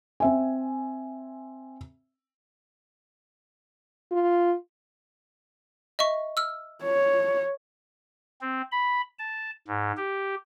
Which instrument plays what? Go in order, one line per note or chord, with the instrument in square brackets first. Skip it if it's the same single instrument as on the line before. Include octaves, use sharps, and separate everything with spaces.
[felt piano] C4 E5 G#5
[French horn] F4
[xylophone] D#5 E5 C#6
E6 F6
[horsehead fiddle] C#5
[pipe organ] C4
B5
A5
G#2
G4